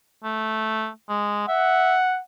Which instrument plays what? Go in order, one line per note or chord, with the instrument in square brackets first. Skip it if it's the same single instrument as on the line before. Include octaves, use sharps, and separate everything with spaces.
[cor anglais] A3
G#3
[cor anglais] E5 [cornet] F#5